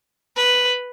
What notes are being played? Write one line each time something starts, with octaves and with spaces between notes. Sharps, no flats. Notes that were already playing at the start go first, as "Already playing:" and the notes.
B4